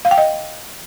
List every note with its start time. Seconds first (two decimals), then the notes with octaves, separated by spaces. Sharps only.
0.05 F5
0.11 G5
0.18 D#5